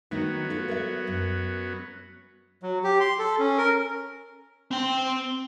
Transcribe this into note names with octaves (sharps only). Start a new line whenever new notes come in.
D#3 F#3 A3 B3 D#4
F4 A4
A#4 D5 E5
F#2
F#3
G4
C6
A4
C#4
A#4
C4 G5